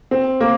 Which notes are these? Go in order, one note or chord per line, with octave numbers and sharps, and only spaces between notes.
C4
A#3